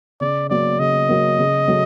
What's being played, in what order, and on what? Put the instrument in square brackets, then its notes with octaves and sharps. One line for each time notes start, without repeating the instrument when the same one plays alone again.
[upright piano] C#3 [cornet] D5
[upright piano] F#3 A#3 [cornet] D5
[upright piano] C#3 [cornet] D#5
[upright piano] F#3 A#3
C#3
F#3 A3